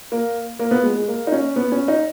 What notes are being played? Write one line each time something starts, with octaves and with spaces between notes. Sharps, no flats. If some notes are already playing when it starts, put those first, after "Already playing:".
A#3
A#3
B3
G#3
G#3
A#3
D#4
C#4
B3
C#4
D#4